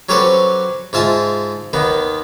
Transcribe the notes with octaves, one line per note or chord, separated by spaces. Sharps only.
F#3 C#4 G4 A4 B4 C5
G#2 F4 E5 G#5 A5
D#2 D#3 B3